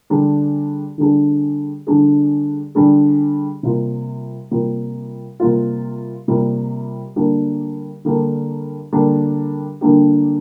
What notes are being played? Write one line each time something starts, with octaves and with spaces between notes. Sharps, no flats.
D3 G3 D4 G#4
D3 G3 D4 G#4
D3 G3 D4 G#4
D3 G3 D4 G#4
C3 G3 A#3 F4
C3 G3 A#3 F4
C3 G3 A#3 F4
C3 G3 A#3 F4
D3 G3 A#3 D4 G4
D3 G3 A#3 D4 G4
D3 G3 A#3 D4 G4
D3 G3 A#3 D4 G4